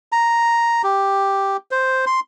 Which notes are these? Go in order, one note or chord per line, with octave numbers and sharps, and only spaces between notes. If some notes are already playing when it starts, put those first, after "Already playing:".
A#5
G4
C5
C6